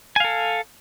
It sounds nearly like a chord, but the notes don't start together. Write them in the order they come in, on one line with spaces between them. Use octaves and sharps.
G#5 F5 A4